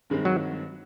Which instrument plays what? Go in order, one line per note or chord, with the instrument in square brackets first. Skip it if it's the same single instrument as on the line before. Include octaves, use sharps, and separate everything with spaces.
[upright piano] G2 D#3 G#3 C4
[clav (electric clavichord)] F#3